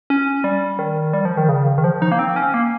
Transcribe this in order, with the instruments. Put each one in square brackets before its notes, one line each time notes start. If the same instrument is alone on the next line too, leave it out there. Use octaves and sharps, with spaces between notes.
[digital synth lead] C#4
G3
D#3
G3
F3
D#3
C#3
D#3
F3
D#4
A#3
C4
C#4
A#3